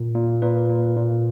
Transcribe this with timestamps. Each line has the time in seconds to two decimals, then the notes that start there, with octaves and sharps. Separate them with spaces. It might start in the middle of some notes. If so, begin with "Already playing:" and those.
Already playing: A#2
0.15 A#2
0.42 A#2 B4
0.70 A#2
0.97 A#2